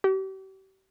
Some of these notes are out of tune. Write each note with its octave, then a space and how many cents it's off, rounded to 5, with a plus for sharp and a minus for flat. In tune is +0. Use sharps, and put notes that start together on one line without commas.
G4 -40